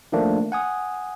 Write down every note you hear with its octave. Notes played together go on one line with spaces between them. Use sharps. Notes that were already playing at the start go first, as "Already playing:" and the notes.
D#3 F3 A3 A#3 D4
F#5 G#5 D#6